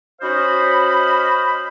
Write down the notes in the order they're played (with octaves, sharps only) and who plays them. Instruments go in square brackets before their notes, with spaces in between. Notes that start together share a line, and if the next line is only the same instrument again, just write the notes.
[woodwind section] C#4 F#4 C5 D#5 F5 B5